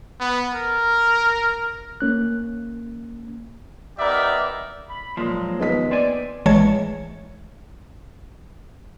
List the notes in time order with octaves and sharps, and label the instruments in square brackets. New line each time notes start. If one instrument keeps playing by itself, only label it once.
[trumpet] B3
A#4
[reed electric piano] A#3 C#4 F#6
[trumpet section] B3 D#4 G4 A#4 D5 E5
[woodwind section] B5
[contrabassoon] A#2 [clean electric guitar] F3 G#3 [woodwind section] F#3
[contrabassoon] D#2 [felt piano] B3 D#5 B6
[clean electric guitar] C4 D4 G#5 [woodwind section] D5
[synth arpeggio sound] A1 E3 G#3 C#5 A5 G#6